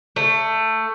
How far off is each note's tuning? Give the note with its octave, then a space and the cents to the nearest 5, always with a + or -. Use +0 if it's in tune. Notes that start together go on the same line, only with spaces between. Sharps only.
A3 +15